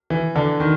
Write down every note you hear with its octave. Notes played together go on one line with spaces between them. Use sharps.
E3
D3
D#3